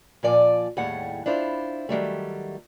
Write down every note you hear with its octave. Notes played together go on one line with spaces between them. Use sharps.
A#2 F3 D5 G#5
D#2 A2 G3 G#4 F#5
D4 E4 F4 C5
D#3 F#3 G3 A3